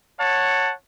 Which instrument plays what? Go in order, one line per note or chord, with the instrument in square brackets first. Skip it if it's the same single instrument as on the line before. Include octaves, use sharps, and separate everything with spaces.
[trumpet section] C#5 F#5 A5